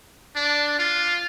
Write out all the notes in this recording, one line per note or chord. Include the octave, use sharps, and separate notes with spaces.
D4
F4